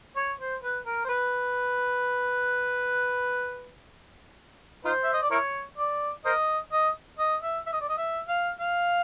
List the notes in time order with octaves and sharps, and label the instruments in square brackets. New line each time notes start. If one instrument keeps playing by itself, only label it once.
[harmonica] C#5
C5
B4
A#4
C5
B4
D#4 F4 C5
E5
D#5
D5
E4 A#4 C#5
D5
A#4 C5 D#5
D#5
D#5
E5
E5
D#5
D5
D#5
E5
F5
F5